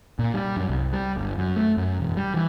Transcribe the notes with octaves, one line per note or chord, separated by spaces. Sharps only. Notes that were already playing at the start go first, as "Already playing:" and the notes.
A#2
G3
F#2
C2
G3
G1
F#2
A3
F#2
E1
G3
E3